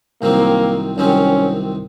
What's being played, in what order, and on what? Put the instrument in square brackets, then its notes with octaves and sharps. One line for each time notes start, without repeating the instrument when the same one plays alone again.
[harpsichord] C2 C3 D#3 F#3 C4 [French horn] A#3
[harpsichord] C2 C3 D#3 F#3 C4 [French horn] C#4